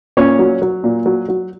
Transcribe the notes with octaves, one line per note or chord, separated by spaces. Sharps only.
A#2 C#4 C#5
F#3
F#3
A#2
F#3
F#3